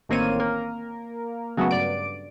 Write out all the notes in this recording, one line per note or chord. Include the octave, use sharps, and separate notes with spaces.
A1 D#3 A#3 C4 C#5 D#7
A#3 A#4
C#3 F#3 A3 B3 F#4
G2 D5 D7